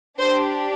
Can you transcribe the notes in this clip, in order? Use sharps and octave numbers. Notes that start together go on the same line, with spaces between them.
D4 G4 C5